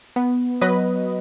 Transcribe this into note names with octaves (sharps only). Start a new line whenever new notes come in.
B3
F#3 B4 D#5